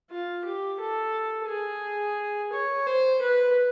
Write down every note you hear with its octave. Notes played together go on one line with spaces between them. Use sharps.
F4
G4
A4
G#4
C#5
C5
B4